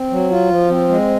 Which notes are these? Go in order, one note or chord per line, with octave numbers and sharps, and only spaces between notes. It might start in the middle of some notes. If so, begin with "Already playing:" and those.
Already playing: C4
F#3
F4
F3
C4
G#3